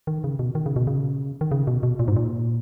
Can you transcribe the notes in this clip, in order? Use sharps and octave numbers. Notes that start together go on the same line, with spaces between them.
D#3
C#3
B2
D#3
C#3
B2
C#3
D#3
C#3
B2
B2
A#2
G#2
A#2